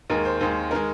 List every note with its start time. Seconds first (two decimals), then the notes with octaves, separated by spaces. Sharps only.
0.10 D#2 D#3 G#3 A#4
0.25 C5
0.40 D#2 D#3 G#3 C5
0.71 D#3 G#3 A#4